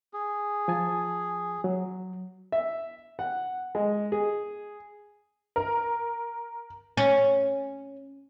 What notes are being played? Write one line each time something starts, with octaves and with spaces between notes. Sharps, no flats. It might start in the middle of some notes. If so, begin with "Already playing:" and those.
G#4
F3 G#5 A5
F#3
E5
F#5
G#3
G#4
A#4
C#4